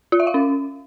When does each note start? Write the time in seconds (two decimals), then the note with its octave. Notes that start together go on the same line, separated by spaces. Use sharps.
0.12 F4
0.20 E5
0.27 F5
0.34 C#4